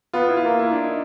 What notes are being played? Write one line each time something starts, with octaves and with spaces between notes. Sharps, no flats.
B3 F4
E4
F4
A#3
E4
D4
D#4